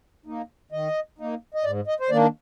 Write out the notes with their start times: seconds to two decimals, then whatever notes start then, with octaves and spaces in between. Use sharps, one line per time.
0.26 A#3 D#4
0.72 D#3 D#5
1.18 A#3 D#4
1.54 D#5
1.64 G#2 D5
1.87 D#5
2.00 C5
2.10 D#3 A#3 D4 D5